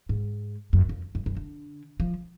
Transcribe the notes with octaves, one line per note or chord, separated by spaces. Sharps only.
G#2
F#2
F2
F#2
F#2
D3
F3